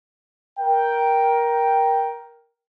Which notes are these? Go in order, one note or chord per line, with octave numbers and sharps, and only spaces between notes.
A#4 G5